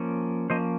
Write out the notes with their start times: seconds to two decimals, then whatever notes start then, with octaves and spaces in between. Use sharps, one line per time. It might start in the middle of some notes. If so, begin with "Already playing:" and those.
Already playing: F3 A#3 C#4
0.50 F3 A#3 C#4 C5 D#5